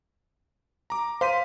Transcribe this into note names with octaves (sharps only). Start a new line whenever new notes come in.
A#5 D6
C5 F5 B6 D#7